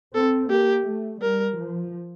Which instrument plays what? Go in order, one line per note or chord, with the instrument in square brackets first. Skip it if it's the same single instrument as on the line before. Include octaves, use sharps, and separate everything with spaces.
[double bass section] C4 [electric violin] A4
[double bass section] A#3 [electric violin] G4
[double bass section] A3
[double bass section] G3 [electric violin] A#4
[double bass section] F3